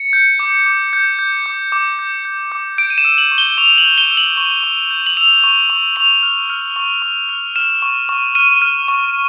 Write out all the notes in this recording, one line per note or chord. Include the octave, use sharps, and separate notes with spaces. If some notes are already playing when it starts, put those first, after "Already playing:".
Already playing: C#7
G6
D6
D6
G6
G6
D6
D6
G6
G6
D6
G6 D7
D#7
E7
E6
F#7
C#6
G7
C#6 F7
F#7
G6
G7
E6
F#7
C#6 F#7
C#6
G6
F#7
E6 F7
C#6
C#6
C#6 F7
F6
F6
C#6
C#6
F6
F6 E7
C#6
C#6
F6 D#7
F6
C#6